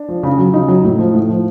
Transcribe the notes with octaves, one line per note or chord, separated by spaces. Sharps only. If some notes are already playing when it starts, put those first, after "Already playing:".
Already playing: D4
F3
C#3
F#3
C#3 D#4
F#3
A2
F3
A2
F3